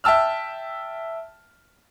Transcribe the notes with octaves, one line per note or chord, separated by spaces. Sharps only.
E5 G5 A5 E6 F6